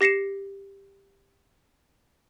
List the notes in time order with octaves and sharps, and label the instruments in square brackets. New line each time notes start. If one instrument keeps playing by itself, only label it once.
[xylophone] G4 A#6 C7 C#7 E7